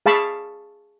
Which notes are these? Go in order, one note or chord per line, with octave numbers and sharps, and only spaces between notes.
G#4 F5 A5 B5 C#6